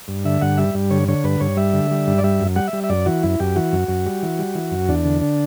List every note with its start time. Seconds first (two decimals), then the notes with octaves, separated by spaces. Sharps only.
0.08 G2
0.25 D3 E5
0.42 G2 F#5
0.58 G3 E5
0.74 G2
0.91 D3 C#5
1.08 D3 C#5
1.24 G2 B4
1.41 G2 C#5
1.57 G3 E5
1.74 D3
1.91 G3
2.07 G2
2.18 D5
2.24 G3 E5
2.40 F#2
2.56 G3 F#5
2.68 E5
2.73 G3
2.84 E5
2.89 F#2 D5
3.06 E3 F#4
3.23 F#2 E4
3.40 F#2 G4
3.56 E3 F#4
3.73 F#2
3.88 F#2
4.06 G3
4.23 E3
4.39 G3
4.55 E3
4.71 F#2
4.88 E2 D4
5.05 D3
5.22 D3